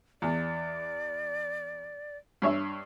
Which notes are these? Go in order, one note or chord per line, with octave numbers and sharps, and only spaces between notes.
E2 D5
G2 C#5 E5